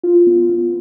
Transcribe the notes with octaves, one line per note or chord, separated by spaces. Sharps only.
F4
B3
B3